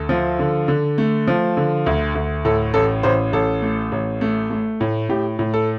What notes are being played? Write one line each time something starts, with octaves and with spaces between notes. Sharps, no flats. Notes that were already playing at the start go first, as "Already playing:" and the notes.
Already playing: D2 A4
F3
D3
D3
A3
F3
D3
D2
D2
A2 A4
A1 A4
A1 C5
A1 A4
A3
A1
A3
A3
A2
A2 G4
A2
A4